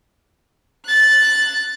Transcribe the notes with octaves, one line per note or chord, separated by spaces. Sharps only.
F#6 A6